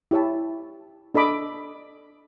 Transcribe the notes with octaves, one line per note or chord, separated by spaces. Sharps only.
E4 G4 C#5 E5 A5
D4 A4 D#5 B5 D6